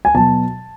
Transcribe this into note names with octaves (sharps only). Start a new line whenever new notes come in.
G#5
B2 F#3 A5